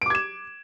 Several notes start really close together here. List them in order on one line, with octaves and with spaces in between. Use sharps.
D7 D6 G#6 E7